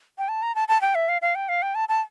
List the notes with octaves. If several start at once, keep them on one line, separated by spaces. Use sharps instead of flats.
G5
A5
A#5
A5
A5
G5
E5
F5
F5
G5
F5
G5
A5
A5